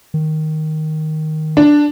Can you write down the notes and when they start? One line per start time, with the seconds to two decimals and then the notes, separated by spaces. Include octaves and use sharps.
0.14 D#3
1.57 D4